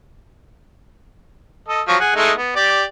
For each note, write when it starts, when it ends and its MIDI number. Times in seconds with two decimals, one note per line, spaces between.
1.68 1.82 69
1.68 1.82 75
1.88 1.96 53
1.88 1.96 54
1.88 1.96 85
2.00 2.12 68
2.00 2.12 78
2.16 2.32 56
2.16 2.32 57
2.16 2.32 63
2.38 2.54 59
2.56 2.84 67
2.56 2.84 74